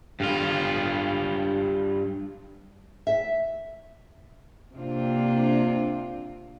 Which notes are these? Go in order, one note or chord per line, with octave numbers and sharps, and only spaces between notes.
G2 F4
E5
C3 A#3 C4 D4 F4